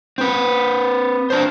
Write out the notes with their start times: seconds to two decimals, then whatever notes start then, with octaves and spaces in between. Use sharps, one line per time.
0.18 C4 B4
1.30 D4 C5